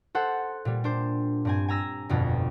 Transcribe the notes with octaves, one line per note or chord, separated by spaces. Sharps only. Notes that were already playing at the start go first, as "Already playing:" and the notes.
A4 C5 F#5
A#2 G3
D4 C5
G2 C4 G#5
G#5 A#5 E6 A#6
G1 F2 B2